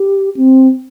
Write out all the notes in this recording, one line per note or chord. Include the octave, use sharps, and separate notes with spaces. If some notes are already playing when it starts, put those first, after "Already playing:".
Already playing: G4
C4